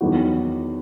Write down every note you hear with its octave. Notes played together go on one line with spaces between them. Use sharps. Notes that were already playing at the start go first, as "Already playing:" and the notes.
E2 D#3 F#3 B3 F#4